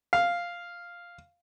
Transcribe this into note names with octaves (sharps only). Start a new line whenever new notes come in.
F5